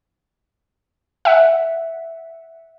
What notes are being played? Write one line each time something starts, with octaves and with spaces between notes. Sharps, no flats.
E5 F#5